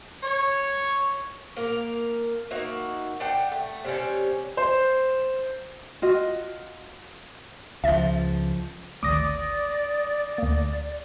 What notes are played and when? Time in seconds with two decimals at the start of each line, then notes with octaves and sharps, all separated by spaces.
0.23 C#5
1.57 A#3 A#4
2.51 A#3 D#4 F#4 E5
3.20 D4 F#5 G5
3.52 A3
3.84 C3 G3 C#4
4.57 C5
6.02 F4 F#4 D#5
7.84 C#2 F3 E5 A6
9.03 G#1 D2 D5 D6 D#6 A#6
10.38 D2 A#3